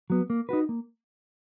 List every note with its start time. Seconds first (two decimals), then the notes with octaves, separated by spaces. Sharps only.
0.10 F#3 B3
0.30 A#3
0.49 D#4 F#4 B4
0.69 A#3